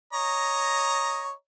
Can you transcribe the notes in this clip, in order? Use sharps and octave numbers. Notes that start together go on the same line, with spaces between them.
C#5 D#5 A#5